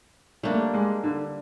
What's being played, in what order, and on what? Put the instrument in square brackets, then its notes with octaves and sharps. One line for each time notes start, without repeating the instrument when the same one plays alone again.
[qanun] G3 A#3 D4 [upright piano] A3
[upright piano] G#3
D3